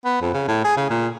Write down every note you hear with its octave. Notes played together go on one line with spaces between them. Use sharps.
B3
F2
C#3
A2
G#4
C#3
A#2